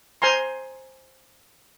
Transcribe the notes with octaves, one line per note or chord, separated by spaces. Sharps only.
C5 G#5 A#5 C6